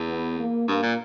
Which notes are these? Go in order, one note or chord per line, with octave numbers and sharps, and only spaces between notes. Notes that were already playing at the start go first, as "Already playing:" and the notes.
Already playing: E2
B3
A#3
G2 A#3
A#2